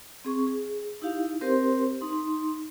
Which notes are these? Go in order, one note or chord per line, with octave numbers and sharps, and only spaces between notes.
C4 G#4 C#6
G#4
D#4 E4 G4 F5
C4 G4 A#4 C5 C6
D#4 C6